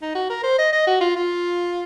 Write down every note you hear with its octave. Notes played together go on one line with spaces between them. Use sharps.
D#4
F#4
A#4
C5
D#5
D#5
F#4
F4
F4